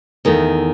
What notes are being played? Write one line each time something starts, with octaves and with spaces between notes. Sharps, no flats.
E2 D#3 A3